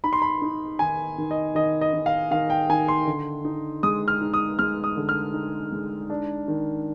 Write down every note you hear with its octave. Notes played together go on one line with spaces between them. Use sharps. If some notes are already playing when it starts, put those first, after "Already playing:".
D#4 B5
C6
B5
D#4
D#3 G#5
D#3
D#5
D#3 D#5
D#5
D#3
F5
D#3 F5
G5
D#3 G#5
C6
D3
D#4
G#3 D#6
F6
D#4
D#6
G#3 F6
D#6
D3
F6
D#4
G#3
D4
D#3